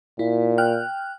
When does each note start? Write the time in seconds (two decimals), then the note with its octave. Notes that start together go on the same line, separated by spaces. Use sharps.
0.19 A#2 E4
0.58 G5 F6 F#6